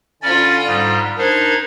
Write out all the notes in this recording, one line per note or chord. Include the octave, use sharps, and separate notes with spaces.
D3 C#4 F4 D5 B5
G#2 G3
D4 D#4 A#4 C5 G#6